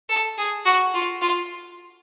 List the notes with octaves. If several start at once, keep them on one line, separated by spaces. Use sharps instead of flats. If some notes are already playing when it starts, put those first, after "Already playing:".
A4
G#4
F#4
F4
F4